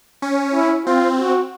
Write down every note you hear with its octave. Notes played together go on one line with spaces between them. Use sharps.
C#4
E4
C4 F4
F#4